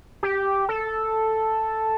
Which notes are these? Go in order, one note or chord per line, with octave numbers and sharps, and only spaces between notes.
G4
A4